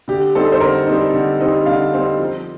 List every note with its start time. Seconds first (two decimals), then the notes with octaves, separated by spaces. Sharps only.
0.08 D3 G4
0.35 G3 C4 D#4 A4
0.52 C5
0.60 D3 A#4
0.87 G3 C4 D#4
1.13 D3
1.40 G3 C4 D#4
1.66 D3 F5
1.94 G3 C4 D#4
2.19 F3